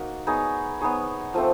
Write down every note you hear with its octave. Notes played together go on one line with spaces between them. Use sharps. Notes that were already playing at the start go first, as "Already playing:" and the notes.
Already playing: A#3 D#4 F#4
B3 D#4 G#4 C#5
B3 D#4 G#4 C#5
F3 A3 C4